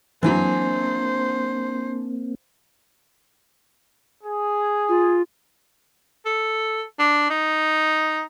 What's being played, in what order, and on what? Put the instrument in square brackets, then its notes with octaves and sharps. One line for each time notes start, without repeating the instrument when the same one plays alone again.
[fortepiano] E3 F#3 [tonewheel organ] A#3 C4 [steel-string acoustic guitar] D4 G#5 [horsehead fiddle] C5
[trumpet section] G#4
[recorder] F4
[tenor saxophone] A4
D4
D#4